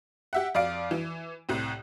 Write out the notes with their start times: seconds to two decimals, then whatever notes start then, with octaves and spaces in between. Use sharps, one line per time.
0.33 G4 E5 F#5
0.54 F2 D5 F5 D7
0.91 E3
1.49 C2 A2 C4